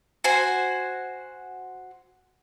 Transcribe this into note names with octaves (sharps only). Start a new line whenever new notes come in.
F#4 C5 G#5